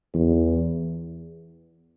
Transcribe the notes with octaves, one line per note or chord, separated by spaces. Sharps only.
E2